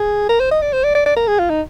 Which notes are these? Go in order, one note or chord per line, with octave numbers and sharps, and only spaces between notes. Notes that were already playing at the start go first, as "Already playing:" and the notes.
Already playing: G#4
A#4
C5
D#5
D5
C5
D5
D5
D5
A#4
G#4
F4
D#4